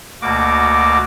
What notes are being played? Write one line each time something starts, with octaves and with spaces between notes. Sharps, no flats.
D2 B2 A#3 F#4 D6